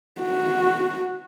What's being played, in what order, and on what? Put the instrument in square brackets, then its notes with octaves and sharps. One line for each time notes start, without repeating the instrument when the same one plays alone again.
[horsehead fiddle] F#4